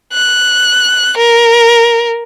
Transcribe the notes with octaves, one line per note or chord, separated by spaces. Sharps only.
F#6
A#4